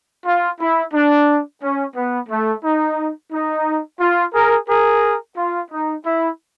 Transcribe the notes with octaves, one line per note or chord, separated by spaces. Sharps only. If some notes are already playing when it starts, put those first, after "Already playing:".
F4
E4
D4
C#4
B3
A3
D#4
D#4
F4
G#4 A#4
G#4 A#4
F4
D#4
E4